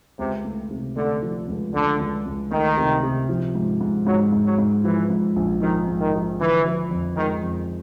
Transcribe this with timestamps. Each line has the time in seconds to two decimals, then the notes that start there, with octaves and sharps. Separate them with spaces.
0.19 C#2 C3
0.45 A3
0.71 C3
0.97 D3 A3
1.22 F3
1.48 C#2
1.74 C#2 D3
2.00 C#2
2.26 C#2
2.51 D#3 A3
2.77 C3
3.03 C3
3.29 F3
3.55 G#2
3.81 G#2
4.07 G#2 F#3
4.33 G#2
4.46 F#3
4.59 G#2
4.84 E3 F3
5.10 G#2
5.36 A#1
5.62 D#3 F3
5.88 G#2
6.00 D#3
6.14 F3
6.39 D3 E3
6.65 F3
6.91 F2
7.17 D#3 G#3
7.43 F2